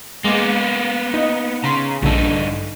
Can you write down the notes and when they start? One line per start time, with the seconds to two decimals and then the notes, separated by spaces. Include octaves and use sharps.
0.24 G#3 A#3 B3 D6
1.14 D#4 D#5
1.64 C#3 A#5 C6 B6
2.02 A#1 G2 D3 D#4 A4